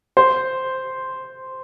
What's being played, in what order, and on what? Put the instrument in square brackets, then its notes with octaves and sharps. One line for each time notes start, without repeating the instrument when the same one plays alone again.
[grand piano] C5